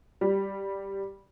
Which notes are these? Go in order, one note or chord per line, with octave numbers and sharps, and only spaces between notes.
G3